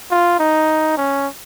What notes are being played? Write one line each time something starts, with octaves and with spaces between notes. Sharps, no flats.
F4
D#4
C#4